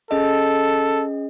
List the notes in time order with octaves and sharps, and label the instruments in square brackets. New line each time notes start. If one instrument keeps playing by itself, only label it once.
[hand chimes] C#4 G#4 D#5 [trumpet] A4